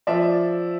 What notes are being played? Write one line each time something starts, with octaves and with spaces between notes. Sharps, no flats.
F3 D5 E5